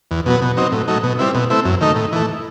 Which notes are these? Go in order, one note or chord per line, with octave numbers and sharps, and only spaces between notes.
E2
B2 F#3 B3
B2
F#3 C4 D#4
A2
F#3 A3 D#4
B2
G3 C4 E4
B2
A3 C4 E4
F#2
D#3 A3 D#4
A2
E3 A3